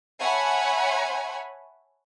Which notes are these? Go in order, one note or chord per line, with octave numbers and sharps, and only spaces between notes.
C#5 E5 F#5 G#5 A5 B5